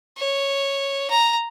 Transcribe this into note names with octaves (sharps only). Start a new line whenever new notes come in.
C#5
A#5